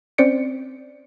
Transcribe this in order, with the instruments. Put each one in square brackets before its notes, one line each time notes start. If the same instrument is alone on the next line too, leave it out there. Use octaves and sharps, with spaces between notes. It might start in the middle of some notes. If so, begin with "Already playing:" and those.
[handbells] C4 C#4 C5 D5 C#7 D7